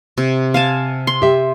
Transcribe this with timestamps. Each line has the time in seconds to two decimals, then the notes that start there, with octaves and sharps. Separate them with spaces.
0.18 C3
0.54 F5 G#5 A5
1.07 C6
1.22 G4 E5